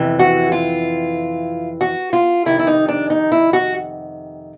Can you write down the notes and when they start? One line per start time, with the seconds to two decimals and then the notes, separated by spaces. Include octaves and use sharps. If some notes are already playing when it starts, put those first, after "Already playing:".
Already playing: F2 C3 E3
0.19 F#4
0.52 F4
1.81 F#4
2.13 F4
2.45 F2 C3 D#3 E4
2.59 E4
2.67 D#4
2.89 D4
3.10 D#4
3.32 E4
3.53 F#4